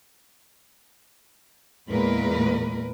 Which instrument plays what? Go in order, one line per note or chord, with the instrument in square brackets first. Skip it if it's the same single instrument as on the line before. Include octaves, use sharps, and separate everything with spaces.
[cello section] E2 A#2 G#3 A#3 A#4 B4